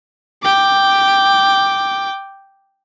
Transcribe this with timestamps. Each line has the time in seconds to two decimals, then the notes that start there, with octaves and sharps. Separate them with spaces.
0.43 G5 D6